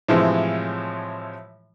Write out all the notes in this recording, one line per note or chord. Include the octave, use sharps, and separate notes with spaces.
A2 C3 E3 F3 G#3